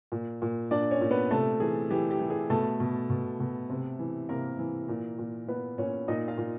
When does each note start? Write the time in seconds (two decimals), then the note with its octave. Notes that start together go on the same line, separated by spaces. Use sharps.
0.12 A#2
0.42 A#2
0.71 A#2 D4 D5
0.91 C#4 C#5
1.01 A#2
1.11 B3 B4
1.31 C3 A3 A4
1.60 E3 G#4
1.91 E3 G4
2.11 G4
2.20 E3
2.30 G#4
2.50 B2 A3 A4
2.80 B2
3.10 B2
3.40 B2
3.70 C3
3.99 E3
4.29 C3 A#3 A#4
4.59 E3
4.88 A#2
5.18 A#2
5.48 A#2 B3 B4
5.78 A#2 C#4 C#5
6.08 A#2 D#4 D#5
6.28 F4 F5
6.38 A#2